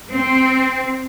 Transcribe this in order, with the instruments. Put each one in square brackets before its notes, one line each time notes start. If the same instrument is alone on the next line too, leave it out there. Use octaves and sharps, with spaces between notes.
[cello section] C4